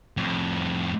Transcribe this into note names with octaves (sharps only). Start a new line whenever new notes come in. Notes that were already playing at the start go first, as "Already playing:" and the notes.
F2 A2